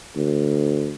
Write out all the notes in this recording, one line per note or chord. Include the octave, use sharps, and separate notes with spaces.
D2